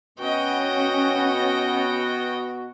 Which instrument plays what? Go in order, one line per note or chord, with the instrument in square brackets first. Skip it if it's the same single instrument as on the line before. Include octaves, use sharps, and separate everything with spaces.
[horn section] B2 F#4 [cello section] C#4 [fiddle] D#5 G5